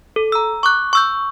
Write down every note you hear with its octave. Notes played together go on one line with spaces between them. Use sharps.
A4
A#5 E6
C#6 D6 F#6
C#6 E6 G6